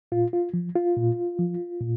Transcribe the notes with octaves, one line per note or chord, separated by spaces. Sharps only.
A#2 F4
F4
F3
F4
A#2
F3
A#2